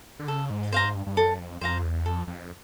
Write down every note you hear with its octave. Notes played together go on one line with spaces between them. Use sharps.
D3
C#3 A4
G#2
G2 C5 F5 A#5
G#2
G2
G2
F#2 A4
F2
F2 C5 F5 A#5
E2
F2 A4
F2